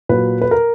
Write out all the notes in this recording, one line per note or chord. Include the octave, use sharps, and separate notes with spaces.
A#2 F#3 B4
B4
A#4